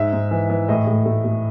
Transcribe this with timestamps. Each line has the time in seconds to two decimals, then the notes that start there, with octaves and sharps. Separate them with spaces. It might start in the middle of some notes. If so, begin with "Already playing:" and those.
Already playing: G#2 E5
0.13 G#2
0.31 E3
0.50 E3
0.69 A2 D#5
0.87 A2
1.06 A3
1.24 A3